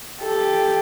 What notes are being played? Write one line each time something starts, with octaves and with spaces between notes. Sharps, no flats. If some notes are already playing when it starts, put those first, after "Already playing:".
G4 A4